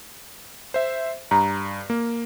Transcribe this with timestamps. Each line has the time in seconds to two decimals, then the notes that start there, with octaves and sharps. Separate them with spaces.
0.74 C5 E5
1.31 G2 A#5
1.90 A#3